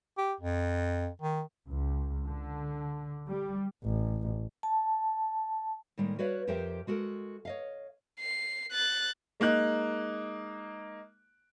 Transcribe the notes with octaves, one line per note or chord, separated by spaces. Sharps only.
G4
F2
D#3
C#2
D3
G3
A1
A5
A2 D#3 G3 G#3 A#3
F#4 B4 C#5 D5 F5
F2 G4 A#4 C5 E5 G5
G#3 F#4 A4 A#4
C#5 D#5 F5
C7
F#6 A6
G#3 A#3 D#4 F#6